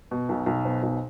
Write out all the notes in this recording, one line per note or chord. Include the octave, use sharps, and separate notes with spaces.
B2
B1
B1
B2 C5
B1